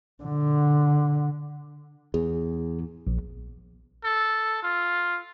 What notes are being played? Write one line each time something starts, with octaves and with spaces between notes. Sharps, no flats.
D3
E2 G#4
A#1
A4
F4